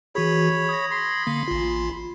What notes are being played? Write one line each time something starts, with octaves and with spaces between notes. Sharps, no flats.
E3 F#4 G#4 C#5 B5
D#6 G#6 A#6
B5 C6
D3 A#3
A1 F4